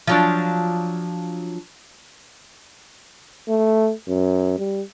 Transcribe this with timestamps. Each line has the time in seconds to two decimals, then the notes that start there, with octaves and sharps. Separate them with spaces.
0.07 F3 F#3 D4
3.48 A3
4.07 F#2
4.59 G3